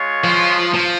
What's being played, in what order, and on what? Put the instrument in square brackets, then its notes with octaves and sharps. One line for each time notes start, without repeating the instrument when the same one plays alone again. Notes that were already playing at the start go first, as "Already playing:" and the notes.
Already playing: [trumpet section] G#3 F4 C#5
[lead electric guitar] F3
F3